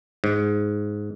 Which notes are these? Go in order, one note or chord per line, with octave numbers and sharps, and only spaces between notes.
G#2